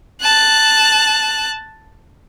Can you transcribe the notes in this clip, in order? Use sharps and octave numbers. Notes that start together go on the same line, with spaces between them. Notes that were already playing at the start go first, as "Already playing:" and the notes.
A5 F#6